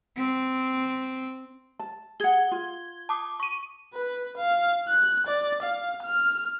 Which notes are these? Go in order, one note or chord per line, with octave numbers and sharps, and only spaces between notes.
C4
A5
G#4 F#5 G#6 G7
F4
A5 D6 D#6
C#6 D#7
B4
F5
F#6
D5
F5
F6